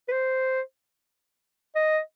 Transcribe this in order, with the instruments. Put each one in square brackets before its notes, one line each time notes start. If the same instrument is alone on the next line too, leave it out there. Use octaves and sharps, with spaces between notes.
[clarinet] B4
C5
D#5